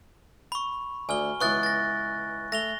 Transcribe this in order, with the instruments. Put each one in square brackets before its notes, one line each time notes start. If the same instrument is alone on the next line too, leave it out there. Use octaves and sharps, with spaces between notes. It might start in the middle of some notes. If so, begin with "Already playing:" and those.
[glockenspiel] B5 C#6
[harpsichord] D2 [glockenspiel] G#5 F6 G7
[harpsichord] C#2 E3 B3 [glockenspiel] C#6 F#6 A6
[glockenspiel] A6 A#6
[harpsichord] A3 [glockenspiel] A#6 F7 G7